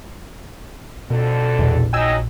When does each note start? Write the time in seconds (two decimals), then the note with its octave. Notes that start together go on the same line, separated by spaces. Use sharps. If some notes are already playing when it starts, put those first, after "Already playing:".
1.10 F2 B2 D3 A4
1.59 A#1 E2
1.93 F#3 D#4 D#5 G5 G#5 E6